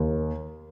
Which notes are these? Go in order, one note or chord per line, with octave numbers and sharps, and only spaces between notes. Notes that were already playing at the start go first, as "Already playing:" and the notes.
Already playing: D#2